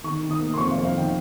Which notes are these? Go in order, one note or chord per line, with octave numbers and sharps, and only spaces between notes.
D#3 C#6
D#3
D#6
A#3
C6
F2 C#6
F5
F2
F5
D#3
G5